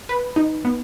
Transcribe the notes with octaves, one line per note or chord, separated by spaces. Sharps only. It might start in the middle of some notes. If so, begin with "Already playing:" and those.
B4
D#4
B3